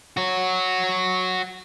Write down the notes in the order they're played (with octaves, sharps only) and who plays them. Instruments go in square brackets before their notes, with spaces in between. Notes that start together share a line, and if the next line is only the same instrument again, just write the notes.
[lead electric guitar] F#4 C#5